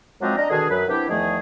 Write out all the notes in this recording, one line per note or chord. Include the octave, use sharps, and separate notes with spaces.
F3 F#3 G#3 C4 D4 D#4
D4 D#5 A#5
B2 D3 D#3 D4 G#4
F#2 F#3 B4
C3 B3 D4 E4 G4
E2 D#3 F3 A3 G#4